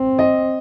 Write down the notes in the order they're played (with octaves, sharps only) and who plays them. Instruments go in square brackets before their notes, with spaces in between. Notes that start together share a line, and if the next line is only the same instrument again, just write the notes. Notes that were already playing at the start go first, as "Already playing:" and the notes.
Already playing: [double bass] C4
[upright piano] D#5